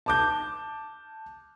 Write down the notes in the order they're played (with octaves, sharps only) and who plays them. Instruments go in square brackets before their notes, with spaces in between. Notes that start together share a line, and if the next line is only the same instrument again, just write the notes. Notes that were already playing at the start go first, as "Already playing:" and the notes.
[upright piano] A5 D6 G6